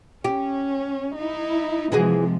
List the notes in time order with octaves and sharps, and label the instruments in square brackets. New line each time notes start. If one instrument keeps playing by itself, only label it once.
[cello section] C#4 [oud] G4
[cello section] D#4 E4
[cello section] C3 F3 G#3 [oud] E3 F#4 G#4